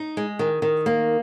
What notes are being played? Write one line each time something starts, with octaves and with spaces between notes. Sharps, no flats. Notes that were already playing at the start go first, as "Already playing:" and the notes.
Already playing: D#4
G#3
D#3
D#3
A#3